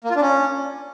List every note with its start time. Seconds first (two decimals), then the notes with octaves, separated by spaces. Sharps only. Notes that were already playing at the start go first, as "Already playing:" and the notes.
0.04 A#3
0.10 F4
0.16 D4
0.21 C#4